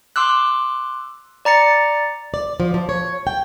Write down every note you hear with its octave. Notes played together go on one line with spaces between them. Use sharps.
C6 D6 E6 F#6
D5 A#5 A6 C#7
D5
F3
F3
C#5
G5